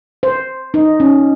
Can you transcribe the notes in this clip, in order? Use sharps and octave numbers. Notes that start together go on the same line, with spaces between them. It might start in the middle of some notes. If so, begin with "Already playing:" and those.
C5
D#4
C#4